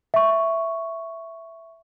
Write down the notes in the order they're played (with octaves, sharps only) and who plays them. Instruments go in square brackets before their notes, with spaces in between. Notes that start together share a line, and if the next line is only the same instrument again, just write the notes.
[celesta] E5 C#6